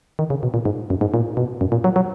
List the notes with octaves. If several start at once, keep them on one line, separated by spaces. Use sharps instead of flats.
D#3
C#3
B2
A#2
G#2
F#2
G#2
A#2
B2
F#2
A#2
F#3
F#3